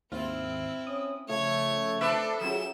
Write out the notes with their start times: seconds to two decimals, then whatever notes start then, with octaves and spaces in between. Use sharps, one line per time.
0.12 D#2 G#2 C4 E4 F4
0.87 C#4 D#6
1.29 C#3 F3 A3 C#5 G#6
2.01 D4 A4 B4 C5 E5
2.41 F#3 C#4 F4 G#4 E7